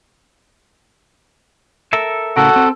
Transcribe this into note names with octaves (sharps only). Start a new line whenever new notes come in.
A4 A#4 E5
A2 C#3 F#4 A4 A#4
C4